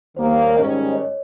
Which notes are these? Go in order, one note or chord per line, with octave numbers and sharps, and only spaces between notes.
D#2 D#3 G3 A#3 C5
C#5
G#2 D#3 G3 C#4 D#5
D#5
C#5